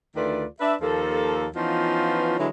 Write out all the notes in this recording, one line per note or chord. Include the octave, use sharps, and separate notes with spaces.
D2 D#3 A3 F4 B4 D5
D4 B4 D5 E5
D#2 F3 A#3 A4
E3 F3 B3 C#4 D#4 F4
D3 E3 F#3 G#3 E4